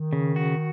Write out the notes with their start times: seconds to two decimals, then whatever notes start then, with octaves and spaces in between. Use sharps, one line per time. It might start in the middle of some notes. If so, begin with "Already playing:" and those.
Already playing: D#3
0.13 C#3
0.36 F#4